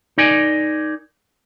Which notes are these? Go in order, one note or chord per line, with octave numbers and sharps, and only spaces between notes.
D#4 A#4 D5 G#5